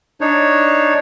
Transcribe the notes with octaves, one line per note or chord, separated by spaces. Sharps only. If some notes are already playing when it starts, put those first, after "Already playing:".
D4 D#4 C#5